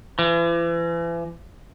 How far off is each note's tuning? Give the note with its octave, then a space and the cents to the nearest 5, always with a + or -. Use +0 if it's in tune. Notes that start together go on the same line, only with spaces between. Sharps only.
E3 +40